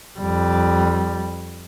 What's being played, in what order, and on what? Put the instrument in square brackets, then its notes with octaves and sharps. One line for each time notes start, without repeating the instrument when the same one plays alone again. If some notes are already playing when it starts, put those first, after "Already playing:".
[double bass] F2 G3